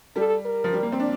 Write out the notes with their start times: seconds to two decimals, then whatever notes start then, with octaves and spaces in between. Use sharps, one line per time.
0.16 G3 A4
0.45 A#4
0.64 F3
0.73 G3
0.83 A#3
0.92 C4
1.00 D4